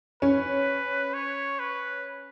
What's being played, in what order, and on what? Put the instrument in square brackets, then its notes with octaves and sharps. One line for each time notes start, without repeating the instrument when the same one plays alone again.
[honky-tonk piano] C#4 [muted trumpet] B4
[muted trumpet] C#5
B4